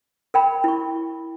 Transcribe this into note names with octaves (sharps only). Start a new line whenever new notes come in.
A#4 G5 B5
E4 C#6